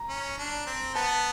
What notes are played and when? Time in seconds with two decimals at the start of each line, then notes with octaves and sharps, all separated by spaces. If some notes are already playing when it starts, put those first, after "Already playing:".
Already playing: A#5
0.09 C#4
0.38 D4
0.66 C4
0.95 B3 A5